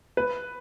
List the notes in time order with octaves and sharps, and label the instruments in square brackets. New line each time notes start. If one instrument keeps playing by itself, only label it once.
[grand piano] B4